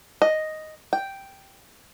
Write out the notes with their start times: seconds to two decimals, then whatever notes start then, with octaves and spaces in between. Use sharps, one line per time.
0.22 D#5
0.93 G5